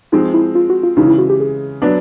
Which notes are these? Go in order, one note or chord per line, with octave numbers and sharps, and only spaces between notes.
F3 G#3 C4 D#4
E4
F4
F#4
F4
C#3 E3 G#3 D#4
E4
F#4
G4
G#4
F#3 B3 D4